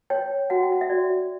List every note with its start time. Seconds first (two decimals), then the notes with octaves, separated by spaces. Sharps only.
0.10 C#5 G5
0.50 F#4 F#5
0.63 G5
0.72 F#5
0.81 E5
0.90 F#4 D5